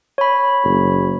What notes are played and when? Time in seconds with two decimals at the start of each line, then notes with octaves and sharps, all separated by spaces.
0.18 C#5 B5
0.64 F#1